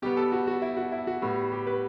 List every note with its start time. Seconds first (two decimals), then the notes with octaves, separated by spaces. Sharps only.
0.02 B2 G3 B3 G4
0.17 A4
0.32 F#4
0.47 F#4
0.62 E4
0.77 F#4
0.92 E4
1.07 F#4
1.22 A2 G3 B3
1.52 G4
1.67 B4